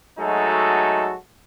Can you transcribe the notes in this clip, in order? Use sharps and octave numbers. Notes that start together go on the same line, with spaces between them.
F#3 G#3 A3 D#4 F#4 A4